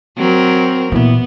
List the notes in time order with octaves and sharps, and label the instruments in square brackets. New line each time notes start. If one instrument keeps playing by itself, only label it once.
[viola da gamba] F#3 C4 A#4
[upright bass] A#2 E3 [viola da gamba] B3